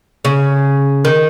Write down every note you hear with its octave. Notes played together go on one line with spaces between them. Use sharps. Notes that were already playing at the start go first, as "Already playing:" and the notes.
C#3
D#3